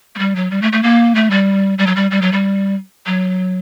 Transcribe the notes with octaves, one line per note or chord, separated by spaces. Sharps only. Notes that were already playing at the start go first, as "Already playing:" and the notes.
A3
G3
F#3
G3
A3
A3
A#3
A3
G3
G3
F#3
G3
G3
F#3
G3
F#3